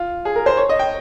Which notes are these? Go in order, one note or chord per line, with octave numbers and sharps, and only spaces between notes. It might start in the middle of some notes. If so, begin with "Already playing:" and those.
Already playing: F4
G#4
A#4
C5
C#5
D#5
G5